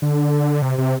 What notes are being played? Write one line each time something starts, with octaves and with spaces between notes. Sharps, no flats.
D3
C3
C3